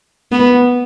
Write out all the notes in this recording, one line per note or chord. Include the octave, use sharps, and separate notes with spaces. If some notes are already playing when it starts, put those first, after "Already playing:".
B3